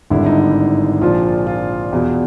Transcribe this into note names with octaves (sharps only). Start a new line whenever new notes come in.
G#1 G2 D3 E4
D#4
E4
A#1 A#2 F3 F4
F4
E2 B2